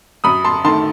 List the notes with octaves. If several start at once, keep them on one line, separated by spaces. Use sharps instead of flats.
F#2 B5 D#6
A5 C6
D#3 A3 A5 C6